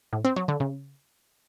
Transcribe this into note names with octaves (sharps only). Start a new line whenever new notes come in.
A2
C4
F#3
D3
C#3